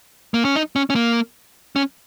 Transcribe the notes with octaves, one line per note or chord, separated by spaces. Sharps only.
A#3
C#4
D#4
C#4
C#4
A#3
C#4